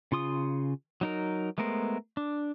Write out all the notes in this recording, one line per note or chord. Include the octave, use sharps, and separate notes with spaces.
C#3 F4 C6 D#6
F#3 D#4 A#4
G#3 A3 B3 A#4 C5
D4